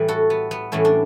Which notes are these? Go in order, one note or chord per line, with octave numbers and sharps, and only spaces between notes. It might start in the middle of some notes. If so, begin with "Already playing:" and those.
Already playing: A2 E3 G3 B4
F#4 A4
B3
B3
A2 E3 G3 A3 C#4
D4